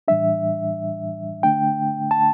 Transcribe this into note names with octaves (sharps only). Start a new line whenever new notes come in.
A2 E3 G3 D4 E5
D3 A3 D4 G5
A5